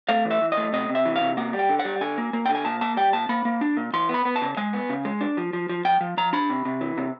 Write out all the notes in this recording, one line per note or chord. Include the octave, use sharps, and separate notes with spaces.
A3 F5
E3
E5
E3
D#5
A3
C3 D#5
C3
E5
E3
F5
C3
A#3 F#5
G3
G5
D3
F#5
G3
D3 G#5
A#3
A#3
D3 G5
G#5
A#2 A5
A#3 A5
G3 G5
A#2 A5
A#3 B5
A#3
D4
A#2
E3 C6
B3 B5
B3
A5
C#3
G#3 G#5
B3
C#3
G#3
D4
F3
F3
F3
F3 G5
F3
F3 A#5
D4 B5
C3
C3
E3
C3